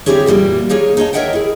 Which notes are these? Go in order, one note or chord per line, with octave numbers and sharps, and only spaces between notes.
D3 C4 E4 G4 G#4 C#5
A#2 E3 G3 A#3 F#4
A#3 D#4 G#4 C#5
D#4 C#5 D#5 A5
A#4 C#5 D#5 E5 F#5 G5
E4 G#4